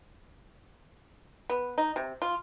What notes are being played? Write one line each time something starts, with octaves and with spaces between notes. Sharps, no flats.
B3
D#4
C3
F4